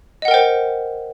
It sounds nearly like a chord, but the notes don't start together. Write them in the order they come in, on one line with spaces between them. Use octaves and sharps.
D#5 F#5 A#4 G5 C5